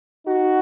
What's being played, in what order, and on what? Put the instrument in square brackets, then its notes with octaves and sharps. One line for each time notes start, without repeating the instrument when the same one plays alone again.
[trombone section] D#4 F#4